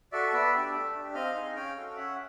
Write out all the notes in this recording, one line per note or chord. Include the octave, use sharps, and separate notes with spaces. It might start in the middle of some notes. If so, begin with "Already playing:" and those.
F#4 A4 D5 E5
B3 D5 E5
D4 G4
A3
D4 G4
C4 D#5 F5
D#4 G#4
C#4 F5 G5
F#4 A4
C#4 E5 F#5